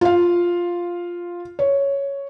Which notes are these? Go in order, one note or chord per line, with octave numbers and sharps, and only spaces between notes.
F4 F5
C#5